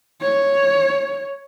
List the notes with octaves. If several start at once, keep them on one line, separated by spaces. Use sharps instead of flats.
C#5